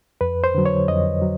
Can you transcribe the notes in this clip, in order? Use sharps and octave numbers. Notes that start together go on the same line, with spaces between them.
F2 B4
C5
D3 F#3
C#5
F2 D#5
F#3